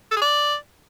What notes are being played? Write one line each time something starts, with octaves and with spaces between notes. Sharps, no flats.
A4
G#4
D5